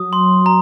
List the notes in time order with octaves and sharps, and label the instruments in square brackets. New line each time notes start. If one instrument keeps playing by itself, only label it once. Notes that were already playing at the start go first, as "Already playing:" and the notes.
Already playing: [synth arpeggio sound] F#3 [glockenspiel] D#6
[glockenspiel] C6
A#5